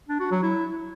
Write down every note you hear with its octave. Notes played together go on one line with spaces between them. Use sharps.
D4
F#4
F#3
E4